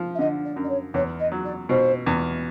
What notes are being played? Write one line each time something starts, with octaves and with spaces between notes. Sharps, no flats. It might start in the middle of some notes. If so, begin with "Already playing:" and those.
Already playing: F3
E5
D3 D#5
D5
F#2
D5
C#5
E2 C#5
D#5
F#3
D5
B2 C5
E2